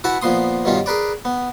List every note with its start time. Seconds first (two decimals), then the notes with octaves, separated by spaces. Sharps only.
0.04 E4 F#4 B4 F#5 A5
0.22 A#2 F3 B3 C6 D#6
0.65 G2 B2 D#3 C#4 F4
0.86 G#4 A#4 B4 D5
1.25 B3